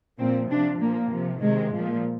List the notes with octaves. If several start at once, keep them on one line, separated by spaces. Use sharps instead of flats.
A#2 F3 C4
C3 F3 D4
A#2 F3 A#3
C3 F3
C3 D#3 G#3
A#2 F3